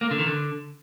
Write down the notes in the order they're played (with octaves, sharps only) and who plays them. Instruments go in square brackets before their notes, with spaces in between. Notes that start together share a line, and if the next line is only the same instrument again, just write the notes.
[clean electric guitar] A#3
D3
D#3
D3